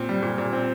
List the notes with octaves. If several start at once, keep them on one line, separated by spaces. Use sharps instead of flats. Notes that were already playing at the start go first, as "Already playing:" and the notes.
Already playing: A#2 C4
G3
A#2
A#2
C4